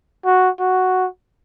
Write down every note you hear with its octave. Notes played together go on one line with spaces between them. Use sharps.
F#4
F#4